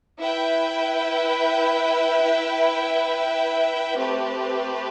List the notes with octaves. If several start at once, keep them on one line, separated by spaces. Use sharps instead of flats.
E4 B4 E5 G5
A3 C4 G4 B4